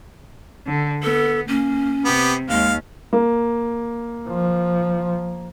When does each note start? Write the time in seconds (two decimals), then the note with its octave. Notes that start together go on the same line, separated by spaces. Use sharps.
0.67 D3
1.03 B3 A4
1.48 A#3 C#4
2.05 C3 B3 G4
2.50 D#2 G#3 F5
3.13 A#3
4.28 F3